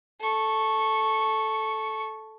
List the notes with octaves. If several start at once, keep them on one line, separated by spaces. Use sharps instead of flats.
A4 C#6